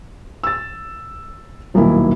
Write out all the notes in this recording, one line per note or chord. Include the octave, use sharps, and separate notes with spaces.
E6 A6
D#1 B1 D#3 A#3 E4